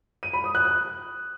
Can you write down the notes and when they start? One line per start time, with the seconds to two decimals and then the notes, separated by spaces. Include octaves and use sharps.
0.23 D#7
0.33 B5
0.44 D#6
0.55 F#6
0.65 F#6